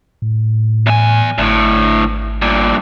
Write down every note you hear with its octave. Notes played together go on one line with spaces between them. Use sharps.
A2
E2 G#5
G#1 D2 A2
G2 A#2